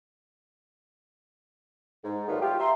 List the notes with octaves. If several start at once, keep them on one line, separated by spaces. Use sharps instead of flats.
G#2
D#3 F#3 G3 A3 B3 F4
F4 G4
E5 A#5 C6